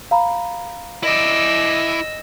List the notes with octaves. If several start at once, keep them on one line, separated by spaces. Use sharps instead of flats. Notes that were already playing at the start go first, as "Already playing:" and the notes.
F5 A#5 B5
E4 D5 D#5 E6